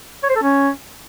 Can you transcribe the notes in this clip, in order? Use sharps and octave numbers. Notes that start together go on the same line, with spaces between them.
C#5
C5
A4
C#4